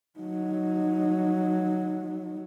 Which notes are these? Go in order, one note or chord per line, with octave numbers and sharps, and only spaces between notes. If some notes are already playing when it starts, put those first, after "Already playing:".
F#3 D#4